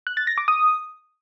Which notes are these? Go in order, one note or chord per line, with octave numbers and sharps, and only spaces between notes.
F#6
A6
A#6
D6
D#6